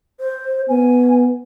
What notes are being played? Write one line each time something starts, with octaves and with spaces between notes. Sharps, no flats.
C5
B3 G#5